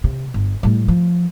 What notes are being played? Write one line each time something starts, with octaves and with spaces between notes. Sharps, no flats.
C3
G1
A2 G3
F3